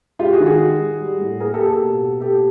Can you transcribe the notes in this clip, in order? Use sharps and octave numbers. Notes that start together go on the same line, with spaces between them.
G#3 F4 G4
F#4 G#4
D#3
F#4 G#4
G#3
G#3
G3
A2
A#3 G#4 A#4
G4 A4
A#3
G4 A4
B2
B2
A#3 G4 A4